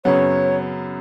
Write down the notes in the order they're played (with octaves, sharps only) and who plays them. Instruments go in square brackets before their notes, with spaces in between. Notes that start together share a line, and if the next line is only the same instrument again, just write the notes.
[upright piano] F#2 C#3 F#3 B3 [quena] C#5